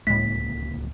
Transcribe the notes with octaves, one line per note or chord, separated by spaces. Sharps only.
D1 C#2 A2 G#3 A#3 B6